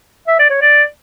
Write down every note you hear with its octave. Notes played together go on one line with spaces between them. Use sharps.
E5
D5
C#5
D5